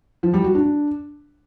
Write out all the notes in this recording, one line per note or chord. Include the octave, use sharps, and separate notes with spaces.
F3
G3
F#4
D4